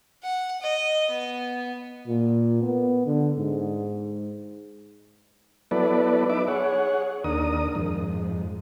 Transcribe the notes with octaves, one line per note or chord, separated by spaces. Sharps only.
F#5
D#5
B3
A#2
B3
D3
G#2
F#3 B3 E4 A4 B4 D5
D#4 B4 E5 D6
G#4 C#5 F#5
D#2 D4 A#4 D#6
F2 G#2